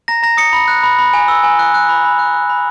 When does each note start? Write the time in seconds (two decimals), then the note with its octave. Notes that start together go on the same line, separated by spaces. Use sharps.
0.08 A#5 A#6
0.23 A#5 A#6
0.37 D#6 C#7
0.53 B5
0.68 F#6
0.83 B5
0.99 B5
1.14 G#5
1.28 E6
1.43 G#5
1.59 F#6
1.74 F#6
1.89 B5
2.04 B5
2.19 F#6
2.34 F#6
2.49 B5